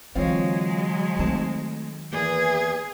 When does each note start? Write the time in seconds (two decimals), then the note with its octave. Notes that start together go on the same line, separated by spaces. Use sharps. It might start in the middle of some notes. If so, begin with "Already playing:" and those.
0.15 D3 E3 F#3 G#3 C4 F4 C#5 F5
1.19 D#3 A3 C4 A5
2.13 E2 E3 A#3 G#4 B4